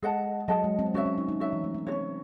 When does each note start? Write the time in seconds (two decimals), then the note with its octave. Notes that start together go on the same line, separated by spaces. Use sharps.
0.03 G#3 G#4 D#5 F#5 A5
0.48 F#3 G#4 D#5 F#5 A5
0.64 G#3
0.79 C4
0.94 C#4 F#4 C#5 E5
1.06 C#4
1.18 D#4
1.29 D#4
1.40 F#3 F#4 C#5 E5
1.53 E3
1.64 A3
1.74 C4
1.87 C4 F#4 C#5
1.92 C#4